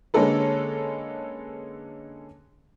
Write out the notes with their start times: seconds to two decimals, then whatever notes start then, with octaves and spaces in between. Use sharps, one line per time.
0.14 D3 G#3 A#3 C#4 A4 B4